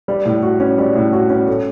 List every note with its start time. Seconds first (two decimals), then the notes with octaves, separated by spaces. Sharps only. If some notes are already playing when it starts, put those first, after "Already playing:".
0.08 G3
0.25 A2
0.43 F#4
0.60 C#4
0.78 G3
0.96 A2
1.13 F#4
1.30 C#4
1.48 A3